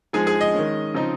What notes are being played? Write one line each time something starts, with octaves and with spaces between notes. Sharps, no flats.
F3 G#3 D#4 G#4 G#5
G#4 G#5
D#5
D#3 G#3 C#4
C#3 F3 C4 D#4